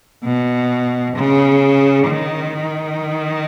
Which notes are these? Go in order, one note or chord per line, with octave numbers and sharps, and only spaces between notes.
B2
C#3
D#3